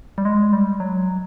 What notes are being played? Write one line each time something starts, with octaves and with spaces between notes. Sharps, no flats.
G3
G#3
G3
F#3